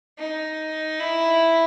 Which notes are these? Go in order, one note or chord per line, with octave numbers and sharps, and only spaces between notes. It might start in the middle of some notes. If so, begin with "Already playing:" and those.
D#4
E4